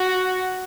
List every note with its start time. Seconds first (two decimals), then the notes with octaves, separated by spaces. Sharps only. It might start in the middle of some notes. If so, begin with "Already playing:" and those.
Already playing: F#4